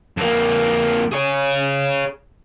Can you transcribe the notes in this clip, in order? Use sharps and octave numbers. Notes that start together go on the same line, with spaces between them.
F2 A#3
G#4 C#5